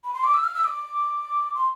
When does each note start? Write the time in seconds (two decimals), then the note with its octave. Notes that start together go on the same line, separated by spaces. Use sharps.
0.04 B5
0.14 C6
0.24 D6
0.34 E6
0.44 F6
0.54 E6
0.64 D6
1.54 C6